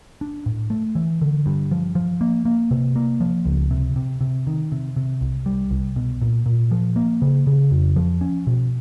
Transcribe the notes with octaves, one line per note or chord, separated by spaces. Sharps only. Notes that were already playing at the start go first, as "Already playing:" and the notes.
D4
A2
A3
E3
D3
G2
F3
F3
A#3
A#3
C3
A#3
F3
C#2
C3
C3
C3
D#3
C3
C3
C2
G3
C2
B2
A#2
A#2
F3
A#3
C#3
C#3
F2
F3
C#4
B2